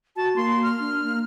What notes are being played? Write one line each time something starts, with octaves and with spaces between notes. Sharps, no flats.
F#4 A5
A#3 C6
F6
D4
A#3